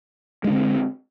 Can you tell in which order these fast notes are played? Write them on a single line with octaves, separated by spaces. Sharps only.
G#3 D4 D3 C4